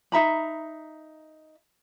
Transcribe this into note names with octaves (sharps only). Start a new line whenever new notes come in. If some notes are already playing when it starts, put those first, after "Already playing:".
D#4 E5 A#5 B5